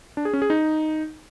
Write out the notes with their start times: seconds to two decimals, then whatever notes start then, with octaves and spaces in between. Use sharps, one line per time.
0.17 D4
0.25 G#4
0.33 C#4
0.42 G#4
0.50 D#4